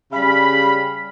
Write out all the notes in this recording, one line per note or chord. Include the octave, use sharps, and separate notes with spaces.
C#3 G3 F5 B5